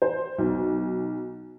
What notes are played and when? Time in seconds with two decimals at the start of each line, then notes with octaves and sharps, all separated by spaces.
0.02 C5
0.38 B1